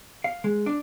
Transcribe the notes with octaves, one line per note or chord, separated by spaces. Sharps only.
F5
G#3
D4